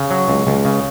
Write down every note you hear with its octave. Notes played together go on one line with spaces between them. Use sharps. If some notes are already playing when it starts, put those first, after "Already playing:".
Already playing: C#3
F#3
C#2
C#2
C#3